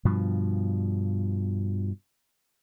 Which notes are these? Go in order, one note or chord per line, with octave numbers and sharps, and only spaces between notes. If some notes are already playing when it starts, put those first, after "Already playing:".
G2 B2 F3